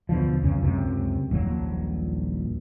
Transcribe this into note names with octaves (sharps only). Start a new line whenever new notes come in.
D2 B2 D3 F3
C#2 F#2 C#3 C#4
C#2 F#2 C3
D#1 A#1 F#3 A#3